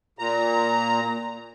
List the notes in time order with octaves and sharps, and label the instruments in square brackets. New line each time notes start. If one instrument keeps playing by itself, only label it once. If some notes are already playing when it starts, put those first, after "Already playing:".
[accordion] A#2 A#5